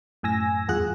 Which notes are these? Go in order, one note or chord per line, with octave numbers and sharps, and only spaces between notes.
F#2 A2 G#5 E6 A#6
E2 G2 F4 G#4 F#5 F#6